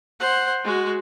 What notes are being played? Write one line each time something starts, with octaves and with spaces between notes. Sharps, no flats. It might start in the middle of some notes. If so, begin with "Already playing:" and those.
C5 F#5
G#3 F#4